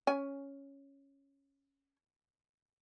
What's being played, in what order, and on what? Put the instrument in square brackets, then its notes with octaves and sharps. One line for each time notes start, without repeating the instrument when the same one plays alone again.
[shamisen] C#4 G#5